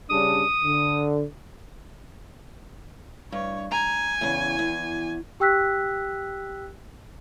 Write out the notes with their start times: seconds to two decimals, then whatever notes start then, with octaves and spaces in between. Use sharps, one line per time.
0.10 C#3 G3 D4 D#6
0.64 D3
3.32 G2 C#5
3.71 G#5 A#5
4.21 E2 C#3
4.59 E2
5.40 G4 G5 E6 F#6 B6